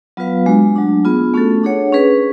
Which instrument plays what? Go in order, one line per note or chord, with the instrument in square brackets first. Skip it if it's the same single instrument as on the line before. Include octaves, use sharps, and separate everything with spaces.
[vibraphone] F#3 B3 F4 B4 F5
G#3 D4 F#4
F#3 A3 D4
B3 F4 G#4
A3 C#4 F#4 A4
D4 G#4 C#5 F#5
C#4 G#4 B4